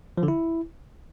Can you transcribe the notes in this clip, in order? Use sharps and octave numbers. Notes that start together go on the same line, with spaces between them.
F3
D3
E4